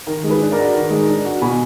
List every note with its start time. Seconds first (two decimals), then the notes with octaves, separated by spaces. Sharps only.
0.07 D#3 A#4
0.24 G#3
0.30 G#4 B4
0.41 D4
0.52 A#4 D5
0.58 F#4
0.74 D#3
0.90 G#3
1.08 D4
1.25 F#4
1.42 B2 G#5 B5